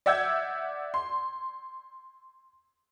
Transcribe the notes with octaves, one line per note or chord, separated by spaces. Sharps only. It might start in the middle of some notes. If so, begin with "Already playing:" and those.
D5 E5 F#5 E6 G6 G#6
C6